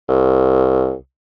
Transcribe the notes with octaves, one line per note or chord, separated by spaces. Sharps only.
C2